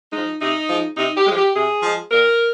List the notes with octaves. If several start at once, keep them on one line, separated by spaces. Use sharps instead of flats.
F3 G#3 D#4
C3 D#4
F3 G#3
C3 D#4
G4
F3 G#3
G4
C3 G#4
F3 G#3
A#2 A#4